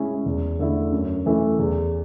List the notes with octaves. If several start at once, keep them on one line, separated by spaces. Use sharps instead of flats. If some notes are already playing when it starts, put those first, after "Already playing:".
Already playing: C#3 G#3 C#4 E4
E2
D3 A3 E4
F#2
E3 A3 C#4 E4
E2